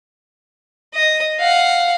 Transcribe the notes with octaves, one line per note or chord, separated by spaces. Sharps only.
D#5
F5 F#5